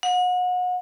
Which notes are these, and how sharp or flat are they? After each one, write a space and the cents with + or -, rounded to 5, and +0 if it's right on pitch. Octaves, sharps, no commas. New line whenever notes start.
F#5 -35